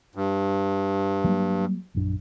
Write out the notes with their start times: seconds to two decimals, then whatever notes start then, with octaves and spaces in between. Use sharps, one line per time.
0.15 G2
1.24 F#3 G3 A#3
1.95 A#1 F#2 D4